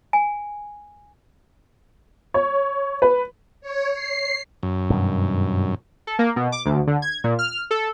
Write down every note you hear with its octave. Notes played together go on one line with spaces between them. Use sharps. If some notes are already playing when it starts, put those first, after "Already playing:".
G#5
C#5
B4
C#5
C7
F#2
G2 B2 D#3
A4
A#3
B2
D6
D2
D3
G#6
A#2
F6
A4